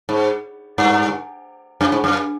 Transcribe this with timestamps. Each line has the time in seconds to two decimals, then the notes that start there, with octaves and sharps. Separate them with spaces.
0.09 G#2
0.78 G2
1.81 F#2
1.92 G#2
2.04 F#2